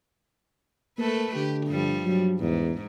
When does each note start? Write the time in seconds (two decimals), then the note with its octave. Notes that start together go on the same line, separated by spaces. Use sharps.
0.98 A3 A#3 A4 B4
1.36 D3 G4
1.67 G2 F3 G3
2.05 F#3
2.40 E2 G#2